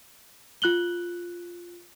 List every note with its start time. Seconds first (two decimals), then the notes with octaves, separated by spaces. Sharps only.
0.62 F4 F#6 F#7 G7